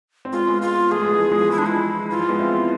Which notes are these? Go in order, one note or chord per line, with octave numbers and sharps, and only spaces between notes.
C4
G#3 B3 F4
G#3 B3
F4
F3 A3 G#4
G#3 B3
E3 G#3
F3
E3 G#3
F3
E3 G#3 E4
D4
G#3
F3 E4
E3 F4
F3
G#3 B3
C4 E4